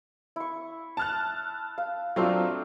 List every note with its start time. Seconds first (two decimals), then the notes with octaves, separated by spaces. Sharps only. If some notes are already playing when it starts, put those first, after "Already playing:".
0.36 E4 C#6
0.97 A5 F6 F#6
1.78 F5
2.16 F#3 A3 C4 D4 F4